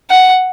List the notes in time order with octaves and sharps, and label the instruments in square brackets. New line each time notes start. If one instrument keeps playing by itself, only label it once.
[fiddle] F#5